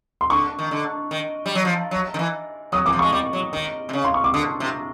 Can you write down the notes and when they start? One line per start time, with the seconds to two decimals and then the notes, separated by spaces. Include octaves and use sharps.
0.21 C6
0.30 D3 C#6
0.59 D#3
0.71 D3
1.11 D#3
1.46 G3
1.55 F#3
1.65 F3
1.91 F#3
2.14 D#3
2.19 E3
2.72 F#3 D#6
2.86 E3 D6
2.93 F3
2.99 G#3 C#6
3.13 G3 D6
3.33 F#3
3.53 D#3
3.89 C3
3.93 C#3
4.05 C6
4.14 C#6
4.24 D6
4.34 D3 D#6
4.60 C3